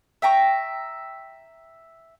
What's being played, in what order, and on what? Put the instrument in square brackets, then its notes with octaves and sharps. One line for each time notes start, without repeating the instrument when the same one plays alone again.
[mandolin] E5 G5 A#5 C#6